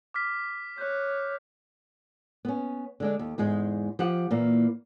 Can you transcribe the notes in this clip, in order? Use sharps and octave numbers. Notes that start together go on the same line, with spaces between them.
D6 F6 B6
C#5 F#6 G6
B3 C#4
D3 G#3 D4
D#2
E2 G#2 G#3
F3 G4 F#5
A#2 E3 A#3